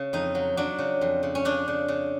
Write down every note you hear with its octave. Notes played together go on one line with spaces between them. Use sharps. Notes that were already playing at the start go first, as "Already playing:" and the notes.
Already playing: C#3
F2 D#4
F#3
F#3 D4
C#3
F2
C#3
C#4
C#3 D4
C#3
C#3